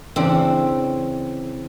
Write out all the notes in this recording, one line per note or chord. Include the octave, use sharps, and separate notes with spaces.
C#3 E3 C4 D4